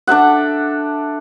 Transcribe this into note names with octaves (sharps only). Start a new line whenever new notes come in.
D4 A4 E5 F#5